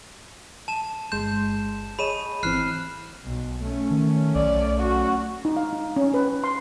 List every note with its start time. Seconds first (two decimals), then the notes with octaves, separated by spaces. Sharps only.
0.68 A5 E7
1.12 G1 G#3 C6 G6 E7
1.99 G#4 C#5 D#5 B5 D#7 E7
2.43 G#1 E3 C4 F6 F#6 C7
3.26 B1
3.61 A3 C#4
3.91 D#3
4.35 B1 D5
4.80 F#4
5.45 D#4
5.56 F5
5.73 D#4
5.96 C#4
6.14 B4
6.44 C6